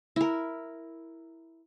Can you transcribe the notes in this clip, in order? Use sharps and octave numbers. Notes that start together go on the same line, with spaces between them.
E4 A#4